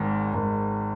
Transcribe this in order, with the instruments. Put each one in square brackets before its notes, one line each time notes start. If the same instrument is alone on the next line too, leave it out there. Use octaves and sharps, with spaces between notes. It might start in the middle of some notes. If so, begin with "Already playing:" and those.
Already playing: [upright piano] G#1 G#2 D#3
G#1 G#2 D#3